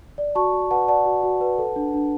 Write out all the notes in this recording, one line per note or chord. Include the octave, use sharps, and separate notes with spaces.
D5
F#4 A5 C#6
F#4
B4 F#5 A5
D5 F#5 A5
F#4
F#4
B4
A4
D4
D4